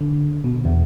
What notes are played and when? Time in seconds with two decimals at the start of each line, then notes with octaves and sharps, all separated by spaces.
0.01 D3
0.44 B2
0.65 E2